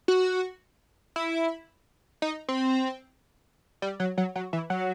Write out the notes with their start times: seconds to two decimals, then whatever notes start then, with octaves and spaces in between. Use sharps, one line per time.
0.08 F#4
1.16 E4
2.22 D#4
2.49 C4
3.82 G3
4.00 F#3
4.18 F#3
4.35 F#3
4.53 E3
4.70 F#3